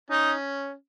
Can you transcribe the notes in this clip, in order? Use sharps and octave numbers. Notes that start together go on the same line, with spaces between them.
C#4 D#4